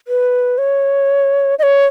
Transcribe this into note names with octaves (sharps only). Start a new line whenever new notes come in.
B4
C#5
D#5
C#5